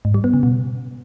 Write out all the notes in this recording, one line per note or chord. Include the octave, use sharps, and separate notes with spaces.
G#2
G3
B3
C#3
B2